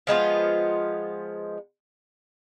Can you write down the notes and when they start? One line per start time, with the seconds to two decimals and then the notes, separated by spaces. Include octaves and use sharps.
0.07 F3 G#3 B3 F4